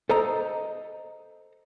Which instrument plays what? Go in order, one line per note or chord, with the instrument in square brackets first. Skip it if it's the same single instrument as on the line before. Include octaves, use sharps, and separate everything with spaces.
[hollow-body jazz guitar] A4 C5 D#5 A#5